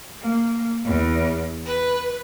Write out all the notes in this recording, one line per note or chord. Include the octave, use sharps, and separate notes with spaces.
A#3
E2
B4